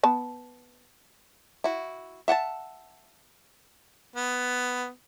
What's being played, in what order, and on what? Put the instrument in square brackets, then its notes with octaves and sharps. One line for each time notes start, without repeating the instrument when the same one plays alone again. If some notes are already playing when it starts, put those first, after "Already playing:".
[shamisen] B3 A5
[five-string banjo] E4 F#4
E5 F#5 G5 A5
[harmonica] B3